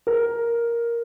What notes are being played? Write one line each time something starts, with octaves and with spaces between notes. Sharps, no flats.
A#4